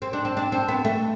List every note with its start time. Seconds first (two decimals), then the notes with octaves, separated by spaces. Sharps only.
0.02 C4
0.13 D4
0.25 C4
0.37 D4
0.52 C4
0.68 B3
0.85 A3